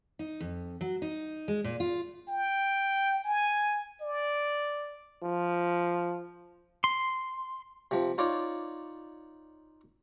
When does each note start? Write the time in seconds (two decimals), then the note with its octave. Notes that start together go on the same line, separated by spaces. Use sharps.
0.19 D#4
0.40 F2
0.81 F#3
1.02 D#4
1.48 G#3
1.64 A#2
1.80 F4
2.28 G5
3.24 G#5
4.01 D5
5.23 F3
6.84 C6
7.91 C3 F3
8.18 D#4 F4 C#5 D5